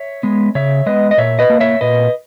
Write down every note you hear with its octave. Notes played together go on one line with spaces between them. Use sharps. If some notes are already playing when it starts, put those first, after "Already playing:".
Already playing: C#5 E5
G#3 B3
C#3 C#5 E5
G#3 B3 B4 D#5
D#5
A#2 C#5 E5
B4 D#5
A#3
C#5 E5
A#2 B4 D#5